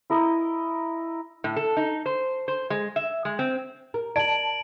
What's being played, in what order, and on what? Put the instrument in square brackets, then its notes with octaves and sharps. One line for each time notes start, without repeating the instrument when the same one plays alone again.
[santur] E4 A#4 D#5
[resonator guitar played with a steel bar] A2
A4
D#4
C5
C5
G#3
E5
G#3
C4
[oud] A#4
[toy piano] D5 [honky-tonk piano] A5 [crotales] D7 F#7